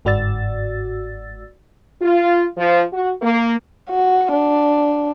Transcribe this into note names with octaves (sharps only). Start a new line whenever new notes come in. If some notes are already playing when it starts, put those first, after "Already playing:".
G1 G#2 F#4 D5 E6 A6
F4
F3
F#4
A#3
F#4
D4